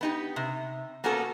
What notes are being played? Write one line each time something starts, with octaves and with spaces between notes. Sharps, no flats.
B3 D#4 G4
C3
A#3 B3 C#4 F#4 A4